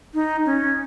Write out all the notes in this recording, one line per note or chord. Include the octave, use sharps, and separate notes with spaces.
D#4
C#4